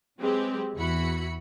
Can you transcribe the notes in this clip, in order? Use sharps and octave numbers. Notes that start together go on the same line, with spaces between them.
F#3 G#3 C4 G4 B4
E2 E4 F#4 B5 C#7